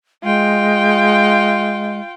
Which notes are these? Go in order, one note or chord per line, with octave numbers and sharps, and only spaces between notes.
G#3 F4 G5